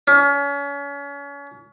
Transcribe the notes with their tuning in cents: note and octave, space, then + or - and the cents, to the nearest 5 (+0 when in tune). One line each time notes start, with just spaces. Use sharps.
C#4 +35